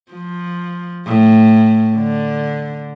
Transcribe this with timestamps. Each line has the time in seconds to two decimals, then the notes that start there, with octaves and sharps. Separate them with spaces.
0.12 F3
1.06 A2
1.96 D3